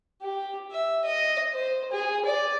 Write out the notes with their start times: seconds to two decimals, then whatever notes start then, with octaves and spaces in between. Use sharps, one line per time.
0.22 G4
0.71 E5
1.05 D#5
1.53 C5
1.92 G#4
2.25 D5